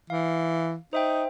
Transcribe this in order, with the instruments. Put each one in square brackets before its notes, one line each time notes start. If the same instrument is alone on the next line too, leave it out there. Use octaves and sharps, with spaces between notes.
[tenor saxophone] E3 [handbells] F5
[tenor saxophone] D#4 [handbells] C5 E5 G5